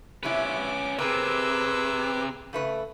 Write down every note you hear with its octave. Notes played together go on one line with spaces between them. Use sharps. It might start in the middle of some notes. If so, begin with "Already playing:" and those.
F#2 C3 C#4 E4 B4 D6
C3 C4 G#4 A#4 B4 D6 E6
C#3 A3 B4